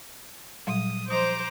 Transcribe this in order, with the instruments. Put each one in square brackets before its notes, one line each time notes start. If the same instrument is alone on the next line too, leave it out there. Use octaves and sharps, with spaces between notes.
[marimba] A#2 F#3 G3 [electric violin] D#6
[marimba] F3 D#6 [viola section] C5 [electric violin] A#5 D6